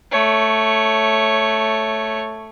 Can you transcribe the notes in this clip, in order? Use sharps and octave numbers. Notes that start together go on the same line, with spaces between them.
A3 C#5